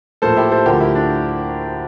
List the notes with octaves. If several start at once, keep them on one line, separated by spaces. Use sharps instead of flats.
A2 F3 A#3 A4 C5
E4 G4
A4 C5
D2 D3 F3 A3 G4 A#4
E4
D4